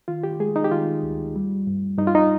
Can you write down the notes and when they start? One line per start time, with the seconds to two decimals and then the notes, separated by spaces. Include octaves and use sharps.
0.08 D#3 F4
0.23 G4
0.40 G#3 G#4
0.56 D#4
0.64 G4
0.71 D#3 F4
1.03 D2
1.36 G3
1.67 G2
1.98 G2 D#4
2.07 F4
2.15 D#4